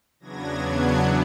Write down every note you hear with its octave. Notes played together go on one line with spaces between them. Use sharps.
E2 C#3 F#3 B3 D4 G#6 A#6
F#6 G#6